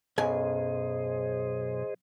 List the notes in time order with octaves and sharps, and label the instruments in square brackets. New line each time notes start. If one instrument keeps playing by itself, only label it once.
[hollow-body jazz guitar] B1 F#2 G#5 [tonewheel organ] G#4 C5 D#5